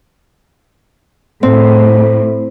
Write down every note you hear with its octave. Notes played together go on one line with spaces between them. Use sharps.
A2 C4